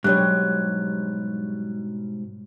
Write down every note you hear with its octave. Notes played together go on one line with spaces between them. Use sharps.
G#2 B2 F#3 G3 D4 G4 C#5 F#6